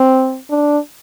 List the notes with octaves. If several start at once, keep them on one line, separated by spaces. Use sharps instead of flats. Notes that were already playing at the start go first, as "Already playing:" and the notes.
Already playing: C4
D4